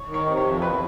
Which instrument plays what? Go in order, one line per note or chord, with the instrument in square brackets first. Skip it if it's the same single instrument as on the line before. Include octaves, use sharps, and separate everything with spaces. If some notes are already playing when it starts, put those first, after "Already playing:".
Already playing: [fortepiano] C#5
[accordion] D#3
[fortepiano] C#5
[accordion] C3
[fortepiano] C#5
[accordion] F2
[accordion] E2 [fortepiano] B4